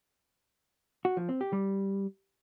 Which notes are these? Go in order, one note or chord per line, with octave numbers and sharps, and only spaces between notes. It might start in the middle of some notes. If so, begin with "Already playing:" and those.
F#4
F3
C4
G4
G3